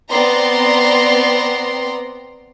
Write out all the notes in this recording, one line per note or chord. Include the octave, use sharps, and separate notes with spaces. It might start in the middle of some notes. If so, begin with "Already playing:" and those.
B3 C4 D5 A#5 C6